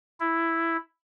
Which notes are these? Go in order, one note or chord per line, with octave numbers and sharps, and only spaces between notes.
E4